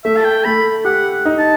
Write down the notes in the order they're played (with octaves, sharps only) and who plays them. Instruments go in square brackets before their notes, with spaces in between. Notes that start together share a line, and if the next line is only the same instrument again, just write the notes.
[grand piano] A3 [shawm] E5
[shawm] A5
G5
[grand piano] A3 [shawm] B5
[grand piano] G4 [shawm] F#5
[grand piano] D#4
[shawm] A5